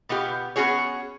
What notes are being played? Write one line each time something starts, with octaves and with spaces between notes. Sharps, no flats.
B2 B3 F4 G4
B3 C#4 F#4 G#4 C#5